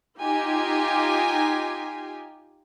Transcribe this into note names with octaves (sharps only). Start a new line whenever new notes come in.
D#4 F4 G4 G#5